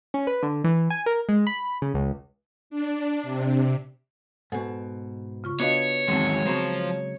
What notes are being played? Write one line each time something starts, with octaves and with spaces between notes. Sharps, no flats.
C#4
B4
D3
E3
G#5
A#4
G#3
B5
C#3
C#2
D4
C3
G#2 B2 A4 F#5 G#5
C#3 F4 C#6
B3 D4 F#4 B4 C#5 D#5 F5
E2 D#3 F#3 G#3 C4 A5
C#3 F3 F#3 G#3 B3 C4 C5 A#5